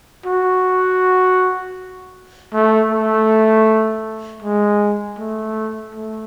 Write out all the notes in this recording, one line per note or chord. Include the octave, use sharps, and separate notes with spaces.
F#4
A3
A3
G#3
A3
A3